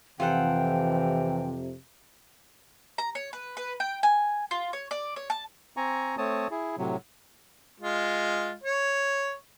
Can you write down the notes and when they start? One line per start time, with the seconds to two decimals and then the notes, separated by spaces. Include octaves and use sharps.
0.20 F2 C3 E3 F4 A4 F#5 G5
2.98 A#5
3.15 C#5
3.33 B4
3.57 B4
3.80 G5
4.03 G#5
4.51 F4
4.73 C#5
4.91 D5
5.16 C#5
5.30 A5
5.77 C4 G#5 A#5 C#6
6.18 A3 C4 C#5 A5 D#6
6.51 E4 G#4
6.78 A2 C3 F#3
7.80 G#3 F4
8.64 C#5